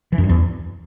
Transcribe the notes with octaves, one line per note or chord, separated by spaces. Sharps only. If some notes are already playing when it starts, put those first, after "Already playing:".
E3
F#2
G2
E2